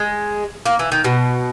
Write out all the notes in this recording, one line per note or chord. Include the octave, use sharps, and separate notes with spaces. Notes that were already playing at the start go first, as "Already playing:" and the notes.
Already playing: G#3
A#3
E3
D#3
B2